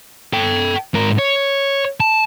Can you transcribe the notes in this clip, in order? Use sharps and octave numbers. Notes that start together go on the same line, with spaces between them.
A4 G5
G#2 A#4
C#5
A5